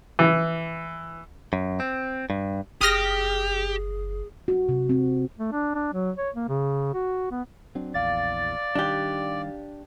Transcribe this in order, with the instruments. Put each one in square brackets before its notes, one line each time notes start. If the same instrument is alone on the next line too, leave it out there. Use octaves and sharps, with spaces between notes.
[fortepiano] E3
[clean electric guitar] F#2
C4
G2
[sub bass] F#1 [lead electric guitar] G4 [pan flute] G#4 [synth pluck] D#6 F6 A#6
[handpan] F#4
C3
C4
[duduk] A3
D4
D4
F#3
C#5
A#3
C#3
F#4
B3
[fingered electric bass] F#3 C4 D4
[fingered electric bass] A#1 E2 [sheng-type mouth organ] D5 [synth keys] F5 A6
[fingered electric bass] D#3 G3 [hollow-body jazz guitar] D4 G4